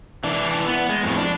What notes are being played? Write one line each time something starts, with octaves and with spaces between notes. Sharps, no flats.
E3 D4
B3
G#3
F2 A2
D4